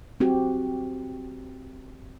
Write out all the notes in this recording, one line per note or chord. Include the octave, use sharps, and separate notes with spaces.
C4 F#4 G4